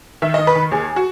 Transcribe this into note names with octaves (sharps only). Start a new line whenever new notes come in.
D#3 E5
D#3 D#5
B4
D#3
D#2 G#4
F#4